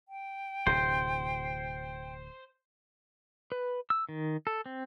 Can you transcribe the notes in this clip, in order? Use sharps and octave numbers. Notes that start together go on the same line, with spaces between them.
G5
D1 C3 C5
B4
E6
D#3
A4
C4